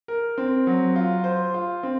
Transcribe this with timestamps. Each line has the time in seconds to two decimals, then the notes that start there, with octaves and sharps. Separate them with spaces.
0.08 A#4
0.38 C4
0.67 F#3
0.96 F4
1.24 C5
1.54 F4
1.83 C4